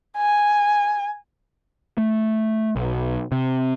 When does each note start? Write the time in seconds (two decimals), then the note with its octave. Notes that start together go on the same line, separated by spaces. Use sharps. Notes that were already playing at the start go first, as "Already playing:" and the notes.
0.17 G#5
1.98 A3
2.76 B1
3.32 C3